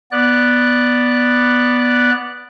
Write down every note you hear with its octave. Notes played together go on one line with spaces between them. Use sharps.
B3 D5 F#6